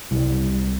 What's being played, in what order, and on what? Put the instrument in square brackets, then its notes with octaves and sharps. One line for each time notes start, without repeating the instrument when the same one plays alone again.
[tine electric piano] C2